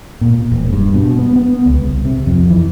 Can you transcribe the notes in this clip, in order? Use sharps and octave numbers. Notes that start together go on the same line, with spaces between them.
A#2
E1
G2
B2
B3
B3
C#2
C2
C3
F2
E3